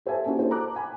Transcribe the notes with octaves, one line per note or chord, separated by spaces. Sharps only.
A4 C5 E5 G#5 A5
A#3 C#4 D4 E4 F#4 G4
A4 C5
A5 A#5 D6 F#6
G#5 B5